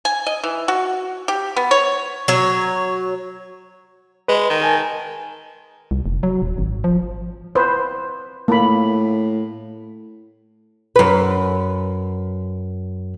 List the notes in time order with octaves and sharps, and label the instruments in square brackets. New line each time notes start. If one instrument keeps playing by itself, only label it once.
[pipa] G#5
D#5
E3
F#4
G4
B3
C#5
[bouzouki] F#3 C#5
[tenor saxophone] G#3 [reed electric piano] B4
[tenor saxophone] D#3
[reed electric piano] A#4 G#5 A5
[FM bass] C2
F1
F#3
D#1
G#1
F3
[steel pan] B4 C5
[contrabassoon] A2 [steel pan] A#3 B5
[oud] F#2 B4